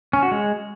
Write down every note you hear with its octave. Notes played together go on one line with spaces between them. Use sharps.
C#4
F#4
G#3